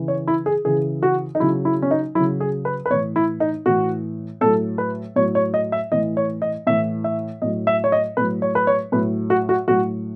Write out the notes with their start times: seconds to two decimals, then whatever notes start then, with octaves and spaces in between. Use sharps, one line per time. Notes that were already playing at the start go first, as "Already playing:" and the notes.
Already playing: C#3 E3
0.08 C#5
0.28 E4
0.46 G#4
0.65 C#3 E3 G#4
1.03 F#4
1.35 D#4
1.40 C#3 F#3 E4
1.65 E4
1.82 C#4
1.91 D#4
2.15 F#3 E4
2.20 C#3
2.40 G#4
2.65 B4
2.86 B4
2.90 A2 C#5
2.93 E3
3.16 E4
3.40 D#4
3.66 A2 E3 F#4
4.41 A2 F#3 A4
4.78 B4
5.16 A2 F#3 C#5
5.35 C#5
5.54 D#5
5.72 E5
5.92 A2 E3 D#5
6.17 C#5
6.42 D#5
6.67 A2 E3 E5
7.04 E5
7.42 A2 F#3 D#5
7.67 E5
7.84 C#5
7.92 D#5
8.17 A2 F#3 B4
8.42 C#5
8.55 B4
8.67 C#5
8.92 A2 F#3 B4
9.30 F#4
9.49 F#4
9.68 A2 F#3 F#4